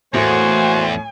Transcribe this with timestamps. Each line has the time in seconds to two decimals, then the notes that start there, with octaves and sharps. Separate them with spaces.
0.14 E2 A2 A3 A#3 F#4 C5 G#5